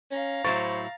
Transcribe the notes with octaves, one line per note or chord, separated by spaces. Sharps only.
C#4 F5 A#5
A2 F#3 E4 C5 C#6 A6